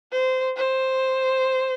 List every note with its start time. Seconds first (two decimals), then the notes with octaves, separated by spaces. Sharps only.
0.12 C5
0.57 C5